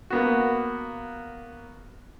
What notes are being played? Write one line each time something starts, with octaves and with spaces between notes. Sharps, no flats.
A#3 B3 F#4